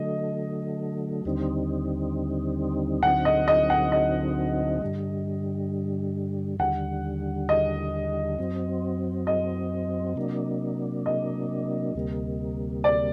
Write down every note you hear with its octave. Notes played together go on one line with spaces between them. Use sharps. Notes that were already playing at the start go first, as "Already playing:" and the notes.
Already playing: D3 F#3 A3 D#5
D#2 D3 G3 C4 D#4
D2 D3 F#3 C4 D#4 F#5
D#5
D#5
F#5
D#5
G2 D3 G3
D#2 D3 G3 F#5
D#5
F#2 F#3 C4
D#5
C3 F#3 A#3 D4
D#5
D2 C3 G3 A#3
D5